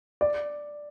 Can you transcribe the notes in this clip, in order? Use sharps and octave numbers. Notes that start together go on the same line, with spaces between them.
D5